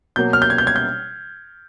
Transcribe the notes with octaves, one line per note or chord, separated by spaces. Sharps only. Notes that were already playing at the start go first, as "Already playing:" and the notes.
B2 F#3 A#3 G6
F6
G6
G#6
G6
G#6
G6